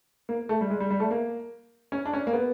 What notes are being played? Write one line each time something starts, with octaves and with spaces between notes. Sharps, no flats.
A#3
A3
G3
G#3
G3
G3
A3
A#3
C#4
D4
C#4
A#3
B3